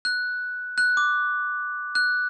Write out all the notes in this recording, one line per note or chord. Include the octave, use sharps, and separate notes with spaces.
F#6
F#6
D6
F#6